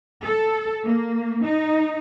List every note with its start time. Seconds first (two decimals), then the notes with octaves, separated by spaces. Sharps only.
0.24 A4
0.84 A#3
1.45 D#4